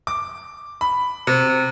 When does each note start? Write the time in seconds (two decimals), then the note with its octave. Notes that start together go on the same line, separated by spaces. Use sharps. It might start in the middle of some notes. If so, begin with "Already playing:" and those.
0.07 D6
0.81 B5
1.27 C3